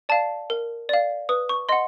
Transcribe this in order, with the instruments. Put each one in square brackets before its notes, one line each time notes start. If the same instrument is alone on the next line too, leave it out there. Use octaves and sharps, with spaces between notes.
[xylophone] D5 F5 A5
A#4
D5 F5
B4 D#6
C#6
D#5 F#5 C6